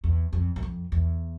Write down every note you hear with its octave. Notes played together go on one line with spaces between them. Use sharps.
E2
F2
F#2
F2
E2